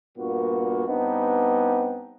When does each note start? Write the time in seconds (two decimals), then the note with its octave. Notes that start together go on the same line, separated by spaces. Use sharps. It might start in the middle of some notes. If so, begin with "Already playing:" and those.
0.17 G2 A#2 A#3 B3 F#4
0.88 G2 B3 C4 D4 D#4